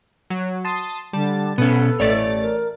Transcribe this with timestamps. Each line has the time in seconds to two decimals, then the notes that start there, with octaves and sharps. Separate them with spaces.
0.30 F#3
0.65 A5 C6 D#6
1.13 D3 G3 A5
1.58 B2 B3 C#4 A4
2.00 A1 A3 C#5 D5 A6
2.40 A#4